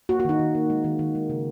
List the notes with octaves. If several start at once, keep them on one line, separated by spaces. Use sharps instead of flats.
A#3 F#4
F#4
D#3 D#4
D#3
A#3
G#3
D#3
D#3
G#3
C#3